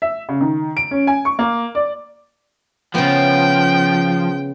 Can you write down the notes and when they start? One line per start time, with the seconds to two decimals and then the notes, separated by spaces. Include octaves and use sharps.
0.02 E5
0.29 C#3
0.41 D#3
0.77 D7
0.91 C#4
1.07 G#5
1.25 C#6
1.39 A#3
1.75 D5
2.95 C#3 F3 B3 G5